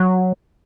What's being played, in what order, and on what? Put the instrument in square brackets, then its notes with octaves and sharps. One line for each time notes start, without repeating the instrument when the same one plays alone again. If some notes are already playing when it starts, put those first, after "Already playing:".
Already playing: [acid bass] F#3